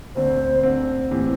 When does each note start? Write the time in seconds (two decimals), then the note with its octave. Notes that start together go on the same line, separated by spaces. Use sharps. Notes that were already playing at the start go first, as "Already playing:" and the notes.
0.16 D2 D3 C4 C5
0.63 D2 D3 C4
1.11 A2 E3 C4 G4